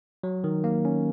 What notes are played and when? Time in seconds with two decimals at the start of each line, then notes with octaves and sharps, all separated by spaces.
0.23 F#3
0.44 D#3
0.64 A#3
0.85 C#4